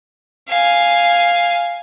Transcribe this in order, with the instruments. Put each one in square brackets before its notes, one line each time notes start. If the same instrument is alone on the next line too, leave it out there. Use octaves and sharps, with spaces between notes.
[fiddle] F5 G#5